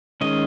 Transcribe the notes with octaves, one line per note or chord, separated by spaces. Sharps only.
D#3 G#3 C#4 D#5